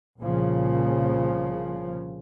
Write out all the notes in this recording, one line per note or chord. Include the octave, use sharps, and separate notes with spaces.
C2 A#2 C#3 F3